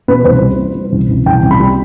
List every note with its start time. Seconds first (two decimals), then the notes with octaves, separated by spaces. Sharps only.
0.08 B2 B4
0.25 C2 C5
0.41 G3
0.58 G3
0.75 G3
0.92 C2
1.09 C2
1.26 C2 G5
1.43 C2
1.51 B5
1.60 G3